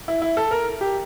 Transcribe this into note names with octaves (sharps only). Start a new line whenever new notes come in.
E4
E4
A4
A#4
G4